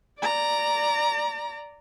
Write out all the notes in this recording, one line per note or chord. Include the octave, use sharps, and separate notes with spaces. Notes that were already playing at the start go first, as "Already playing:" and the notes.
D5 A#5